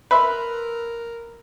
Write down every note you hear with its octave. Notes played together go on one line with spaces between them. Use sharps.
A#4 B4 E5 B5 C6